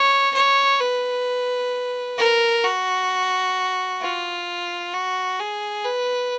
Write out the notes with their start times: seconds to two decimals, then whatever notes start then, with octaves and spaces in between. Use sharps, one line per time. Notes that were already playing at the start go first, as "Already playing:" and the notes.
Already playing: C#5
0.34 C#5
0.80 B4
2.18 A#4
2.64 F#4
4.02 F4
4.94 F#4
5.40 G#4
5.85 B4